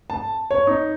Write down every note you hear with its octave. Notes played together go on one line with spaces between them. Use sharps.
A5
C#5
D#4